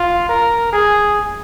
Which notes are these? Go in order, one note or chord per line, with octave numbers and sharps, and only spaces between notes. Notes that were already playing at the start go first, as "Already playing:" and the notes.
Already playing: F4
A#4
G#4